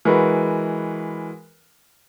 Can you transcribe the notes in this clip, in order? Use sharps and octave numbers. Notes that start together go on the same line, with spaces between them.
E3 G#3 F#4 A#4 B4